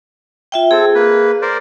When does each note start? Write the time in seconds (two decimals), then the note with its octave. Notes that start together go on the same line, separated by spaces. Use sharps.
0.52 F4 E5 G5
0.71 C4 G#4 A4
0.95 A#3 B4
1.42 A#4 C5 D5